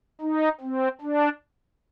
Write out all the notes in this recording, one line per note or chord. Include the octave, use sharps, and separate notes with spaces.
D#4
C4
D4